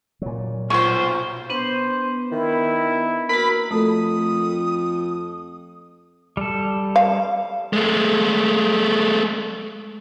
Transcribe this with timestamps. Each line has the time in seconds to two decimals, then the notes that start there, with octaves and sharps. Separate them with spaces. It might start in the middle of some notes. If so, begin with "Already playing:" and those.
0.22 A#2 F#3
0.70 B1 F4 C5 C6 C#6
1.50 B3 D4 B4 C5
2.31 D#3 E4
3.29 A#3 F#4 A#4 B5
3.71 F2 A3 A4 D#6
6.37 G3 A4
6.96 F5
7.73 G#3 A3